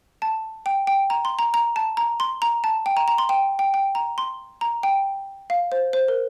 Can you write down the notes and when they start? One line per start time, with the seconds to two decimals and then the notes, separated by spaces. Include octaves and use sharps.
0.22 A5
0.66 G5
0.87 G5
1.10 A#5
1.25 C6
1.39 A#5
1.54 A#5
1.76 A5
1.97 A#5
2.20 C6
2.42 A#5
2.64 A5
2.86 G5
2.97 A#5
3.08 A#5
3.18 C6
3.29 G5
3.59 G5
3.74 G5
3.95 A#5
4.18 C6
4.61 A#5
4.83 G5
5.50 F5
5.72 C5
5.93 C5
6.08 A#4